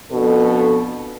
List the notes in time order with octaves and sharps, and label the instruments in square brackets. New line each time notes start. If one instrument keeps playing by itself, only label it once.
[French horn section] F2 B2 D4 A4